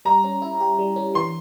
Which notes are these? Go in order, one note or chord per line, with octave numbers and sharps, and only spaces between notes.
G3 A#5
C#4
E4
G4
G3
C#4
E3 C6